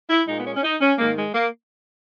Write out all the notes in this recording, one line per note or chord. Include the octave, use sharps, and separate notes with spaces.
E4
A#2 G#3 D#4
B3
C#4
C#4
D#4
C#4
G#2 D#3 G#3 A#3
G#3
A#3